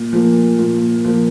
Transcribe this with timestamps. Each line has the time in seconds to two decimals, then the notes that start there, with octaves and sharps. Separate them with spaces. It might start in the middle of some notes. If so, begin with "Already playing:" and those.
Already playing: A#2
0.13 F3 A#3
0.59 A#2
1.05 F3 A#3